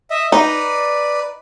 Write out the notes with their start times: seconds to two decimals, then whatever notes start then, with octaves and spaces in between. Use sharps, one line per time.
0.11 D#5 E5
0.32 D#4 B4 D5